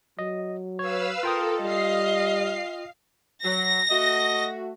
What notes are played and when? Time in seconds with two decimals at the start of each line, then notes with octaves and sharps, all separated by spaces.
0.19 F#3 D#5
0.79 B4 C#5 F5 E6
1.23 F4 A4 A#4 G5 D#6
1.61 G3 D#5 F5 C7
3.44 F#3 A#6
3.90 A3 F#4 D#5